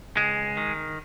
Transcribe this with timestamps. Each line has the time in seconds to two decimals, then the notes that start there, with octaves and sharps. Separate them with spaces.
0.17 C#2 G#3
0.57 D#3